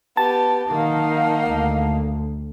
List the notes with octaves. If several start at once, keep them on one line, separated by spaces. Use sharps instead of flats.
B3 G4 A5
D#3 A#3 D#4 F5 F#5
D2